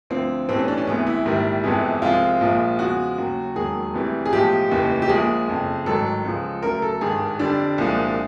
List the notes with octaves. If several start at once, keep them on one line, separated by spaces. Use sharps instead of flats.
D2 D3 F3 C4
B1 A2 E3 G3 C4
C#4
D4
C#4
D2 C3 E3 G#3 B3
E4
A#1 G#2 D#3 G3
G1 F2 C3 E3 G#3
C2 C3 F3 G#3 F4
A#1 A#2 F3 G#3
E2 C#3 F3 G#3 F#4
D#2 C#3 F#3
E1 D#2 D#3 F#3 G#4
D2 C3 E3 G3
G#4
B1 A2 F3 G#3 G4
F1 D#2 C#3 E3
G4
A#1 A#2 F3 G#3 G#4
F#1 F2 C#3
A1 G#2 D#3 F#3 A4
C#2 C#3 F3 G#3
D2 C#3 F#3 A#4
A4
G#1 G2 D#3 G#4
F2 D3 G3 D4
C2 A#2 F3 G#3